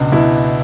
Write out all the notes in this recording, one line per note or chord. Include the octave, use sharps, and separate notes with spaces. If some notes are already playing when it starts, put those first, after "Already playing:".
Already playing: C#2 B2 D4
B2 E4